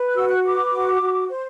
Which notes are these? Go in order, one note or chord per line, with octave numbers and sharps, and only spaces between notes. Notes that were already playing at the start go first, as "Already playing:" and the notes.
Already playing: B4
F#6
F#4 E6
F#6
B4 D6
F#4
F#4
C5